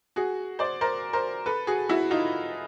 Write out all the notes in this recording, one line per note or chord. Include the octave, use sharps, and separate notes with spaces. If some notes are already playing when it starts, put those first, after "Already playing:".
F#4 G#4
C5 D5
A#4 C5
A#4 C5
A4 B4
F#4 G#4
E4 F#4
D#4 F4